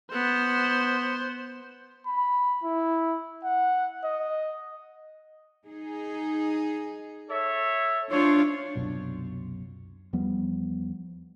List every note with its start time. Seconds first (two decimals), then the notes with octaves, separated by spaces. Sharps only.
0.12 B3 C5
2.06 B5
2.63 E4
3.44 F#5
4.03 D#5
5.67 D#4 G#4
7.29 A4 C#5 E5
8.11 D4 F4 C5 C#5 F5
8.75 C2 F#2 B2
10.13 E2 F3 G3 B3